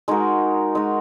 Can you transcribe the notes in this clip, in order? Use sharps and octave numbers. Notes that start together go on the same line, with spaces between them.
G#3 D#4 F#4 A#4
G#3 D#4 F#4 A#4